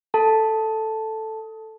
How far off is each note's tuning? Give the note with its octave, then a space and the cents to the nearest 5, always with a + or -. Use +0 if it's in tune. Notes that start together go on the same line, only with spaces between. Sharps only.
A4 +0 A5 +0